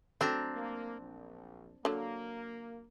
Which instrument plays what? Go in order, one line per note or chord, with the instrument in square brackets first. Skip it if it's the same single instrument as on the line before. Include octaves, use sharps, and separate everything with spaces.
[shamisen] F#3 A3 [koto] C4 D4 A#5
[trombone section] A#3
A#1
[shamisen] D3 F#3 [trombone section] A#3